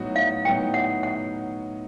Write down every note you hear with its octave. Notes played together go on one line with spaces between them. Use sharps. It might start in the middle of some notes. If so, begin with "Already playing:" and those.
Already playing: A2 F#3 B3 D#4 F#4
F5
A2 F#3 B3 D#4 F#4 G5
F#5
F#5